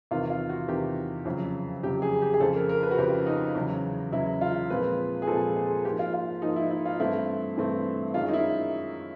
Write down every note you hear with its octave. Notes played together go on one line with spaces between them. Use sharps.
E2 C3 D#3 F4
F4
F#4
E2 C3 D#3 G4
F2 C#3 F#3
F2 C#3 F#3 G4
G#4
G4
G#4
F2 C#3 F3 A4
A#4
A#4
B4
F#4
F2 C#3 F3 G4
D#4
E2 C#3 F#3
E2 C#3 F#3 E4
F4
A#2 F3 G#3 C4 B4
G#4
A#2 F3 G#3 C4 A4
G#4
G#2 F3 A#3 G4
F4
F4
G#2 F3 A#3 D#4
E4
E4
F4
G2 E3 A3 C4 E4
G2 E3 A3 C4
F#2 D#3 G#3 F4
D#4
E4